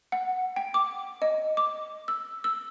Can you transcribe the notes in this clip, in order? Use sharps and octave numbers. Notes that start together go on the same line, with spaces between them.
F#5
G5
D6
D#5
D6
E6
E6